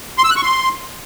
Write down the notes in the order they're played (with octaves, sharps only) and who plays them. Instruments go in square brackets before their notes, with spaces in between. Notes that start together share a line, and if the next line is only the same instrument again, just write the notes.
[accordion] C6
E6
F#6
C#6
C6